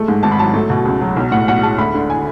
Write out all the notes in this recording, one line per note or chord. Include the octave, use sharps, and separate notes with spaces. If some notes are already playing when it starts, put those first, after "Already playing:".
Already playing: G#3 A3
G#2
G#1 A5
B5
F#3 A5
A3
B2
C#2
F#3
B1
A2 F#5
B1 F#5
G#3 A5
D2 B5
D3
G#5